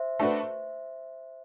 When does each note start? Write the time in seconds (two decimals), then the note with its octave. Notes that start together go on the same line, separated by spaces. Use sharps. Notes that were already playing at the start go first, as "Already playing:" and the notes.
Already playing: C5 E5
0.20 A3 D4 F#4 B4